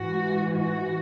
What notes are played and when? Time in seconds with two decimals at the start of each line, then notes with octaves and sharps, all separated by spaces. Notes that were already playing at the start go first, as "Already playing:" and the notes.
Already playing: G#2 E3 F#4
0.51 F#4